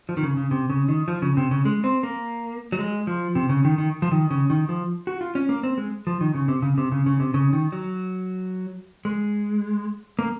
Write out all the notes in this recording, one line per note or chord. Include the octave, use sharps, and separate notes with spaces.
F3
D#3
C#3
C#3
C3
C#3
D#3
F3
C#3
C3
C#3
G#3
C4
A#3
F#3
G#3
F3
C3
C#3
D#3
D#3
F3
D#3
C#3
D#3
F3
F#4
F4
C#4
A#3
C4
G#3
F3
D#3
C#3
C3
C#3
C3
C#3
C#3
C3
C#3
D#3
F#3
G#3
A#3